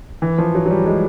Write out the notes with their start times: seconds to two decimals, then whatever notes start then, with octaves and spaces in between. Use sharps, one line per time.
0.22 E3
0.38 F3
0.55 F#3
0.66 F#3
0.70 G3
0.86 G#3